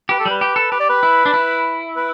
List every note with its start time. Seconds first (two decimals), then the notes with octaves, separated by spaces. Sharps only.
0.09 G4 B4
0.20 A4
0.26 G3 B4
0.41 G4
0.56 A4
0.72 G4 B4
0.80 D5
0.89 B4
1.03 E4
1.26 D4
1.34 E4
1.96 B4